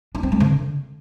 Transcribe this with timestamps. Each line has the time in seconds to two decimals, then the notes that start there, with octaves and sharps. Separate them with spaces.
0.15 D4
0.23 C4
0.32 G#3
0.40 D3